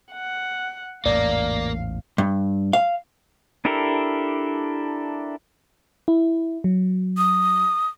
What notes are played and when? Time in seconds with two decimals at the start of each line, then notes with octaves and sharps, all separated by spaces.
0.13 F#5
1.06 A1 E2 G#2 A#3 D5 F5
2.18 G2
2.73 F5
3.65 D4 E4 G4 A4 A#4
6.08 E4
6.64 F#3
7.18 D#6